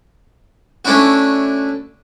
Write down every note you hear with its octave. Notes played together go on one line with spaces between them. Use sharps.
A3 C#4 D4 E4 F#4